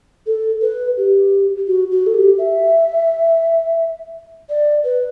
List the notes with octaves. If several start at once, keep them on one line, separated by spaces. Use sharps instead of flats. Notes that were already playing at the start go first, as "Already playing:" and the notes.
A4
B4
G4
F#4
F#4
A4
G4
E5
D5
B4